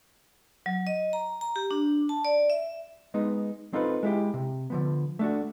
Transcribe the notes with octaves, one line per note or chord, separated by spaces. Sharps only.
F#3
D#5
A#5
A#5
G4
D4
A5
D5
E5
G#3 B3 D#4
C4 D#4 F4 A4 B4
G#3 E4 G4
C3
D3 F3 B3
A3 D4 F#4